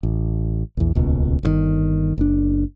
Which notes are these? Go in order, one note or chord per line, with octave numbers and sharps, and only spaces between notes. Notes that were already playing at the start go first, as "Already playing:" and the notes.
A1
A#1 E2
D#1 C#2 B2
G1 C3 D#3
F#1 D4